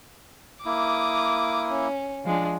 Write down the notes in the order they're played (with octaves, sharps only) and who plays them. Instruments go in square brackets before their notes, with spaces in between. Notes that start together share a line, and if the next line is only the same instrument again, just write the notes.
[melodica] A#3 E4 [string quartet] D6 D#6
[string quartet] C#4
F3 G#3 D4